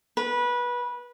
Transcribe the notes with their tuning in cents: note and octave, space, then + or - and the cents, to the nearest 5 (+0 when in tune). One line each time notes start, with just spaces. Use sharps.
B4 -20